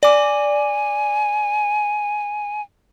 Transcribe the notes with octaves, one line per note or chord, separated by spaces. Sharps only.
D5 G#5 D6